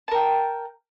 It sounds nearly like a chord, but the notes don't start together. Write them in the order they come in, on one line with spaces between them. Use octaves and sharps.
A5 A#4 G5